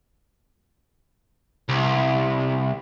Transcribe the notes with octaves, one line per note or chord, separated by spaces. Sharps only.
C2